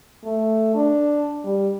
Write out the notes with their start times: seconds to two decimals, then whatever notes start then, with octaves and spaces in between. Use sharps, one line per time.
0.24 A3
0.75 D4
1.44 G3